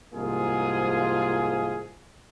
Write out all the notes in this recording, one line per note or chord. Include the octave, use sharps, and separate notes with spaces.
C2 G#2 F3 A#3 F4 G#4